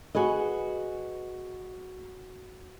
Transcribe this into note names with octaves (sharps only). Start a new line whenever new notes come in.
F#4 G#4 B4 D#5